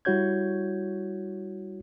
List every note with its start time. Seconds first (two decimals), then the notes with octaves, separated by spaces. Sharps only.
0.05 G3 E4 F#4 C#5 G6 G#6